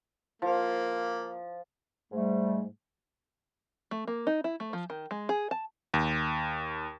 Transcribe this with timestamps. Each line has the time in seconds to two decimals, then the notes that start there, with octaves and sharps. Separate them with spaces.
0.42 F3 A#3
2.12 G#2 G3 A3
3.91 A3
4.07 A#3
4.27 D#4
4.44 E4
4.60 A3
4.73 F3
4.90 D#3
5.11 G#3
5.29 G#4
5.51 A5
5.94 D#2